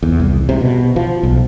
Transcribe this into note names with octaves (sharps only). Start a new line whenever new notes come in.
E2
C2
C3
B2
F3
B1